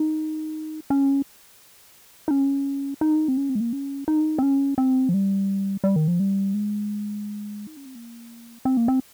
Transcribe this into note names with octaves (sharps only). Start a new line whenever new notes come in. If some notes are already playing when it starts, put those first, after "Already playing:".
Already playing: D#4
C#4
D#4
C#4
D#4
C4
C#4
C4
G#3
A#3
C#4
D#4
C4
C#4
C4
F3
G3
G3
D#3
F3
G3
G#3
D#4
C#4
C4
A#3
C4
A#3
C4